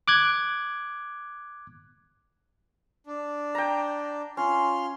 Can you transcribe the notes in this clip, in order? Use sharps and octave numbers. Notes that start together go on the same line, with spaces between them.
D6 F#6 G#6
D4
G5 A#5
C#4 F4 C6 F6